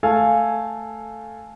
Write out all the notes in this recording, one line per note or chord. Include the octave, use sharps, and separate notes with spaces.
A3 A4 F5 G#5